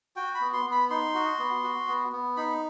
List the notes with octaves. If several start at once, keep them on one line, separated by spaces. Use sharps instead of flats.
F#4 G5
B5
B3
C6
B3
B5
D#4 C6
F#4
B3
F#4
B3
B3
D#4 B5